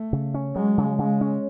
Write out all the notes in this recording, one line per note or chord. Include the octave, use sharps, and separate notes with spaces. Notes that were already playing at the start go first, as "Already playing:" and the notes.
Already playing: A3
C#3
C#4
F#3 G#3
C#3
C#3 G#3
C#4